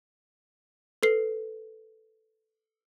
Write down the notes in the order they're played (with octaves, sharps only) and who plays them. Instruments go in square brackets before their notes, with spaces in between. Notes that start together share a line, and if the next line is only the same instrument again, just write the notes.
[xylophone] A4 B4 C7